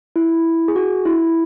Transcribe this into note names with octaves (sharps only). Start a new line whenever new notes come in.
E4
G#4
F#4
E4